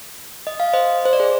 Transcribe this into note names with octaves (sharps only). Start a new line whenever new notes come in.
D#5
F5
C5 D#5
C5
D5
G#4 C5